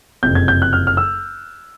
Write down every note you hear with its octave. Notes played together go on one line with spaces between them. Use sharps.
F#1 F2 C3 G6
G#6
G6
F#6
F6
F6
E6